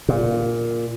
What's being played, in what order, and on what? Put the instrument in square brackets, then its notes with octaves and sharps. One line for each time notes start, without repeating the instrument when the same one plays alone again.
[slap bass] A#2